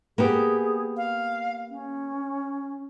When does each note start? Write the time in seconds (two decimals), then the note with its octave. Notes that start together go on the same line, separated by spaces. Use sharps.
0.18 A#3 B3 G4 G#4
0.97 F5
1.70 C#4